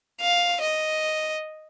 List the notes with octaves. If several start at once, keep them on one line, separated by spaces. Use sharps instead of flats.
F5
D#5